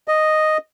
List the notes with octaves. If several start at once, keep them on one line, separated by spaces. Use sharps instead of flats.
D#5